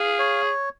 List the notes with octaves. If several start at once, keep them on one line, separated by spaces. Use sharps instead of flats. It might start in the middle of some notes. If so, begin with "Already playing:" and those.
Already playing: G#4 F5
C#5